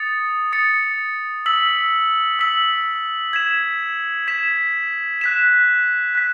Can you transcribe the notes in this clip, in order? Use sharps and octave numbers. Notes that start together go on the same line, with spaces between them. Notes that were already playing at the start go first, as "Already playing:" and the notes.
Already playing: D#6 A6 C#7
D#6 A6 C#7
E6 B6 F#7
E6 B6 F#7
G#6 B6 E7
G#6 B6 E7
F#6 B6 E7
F#6 B6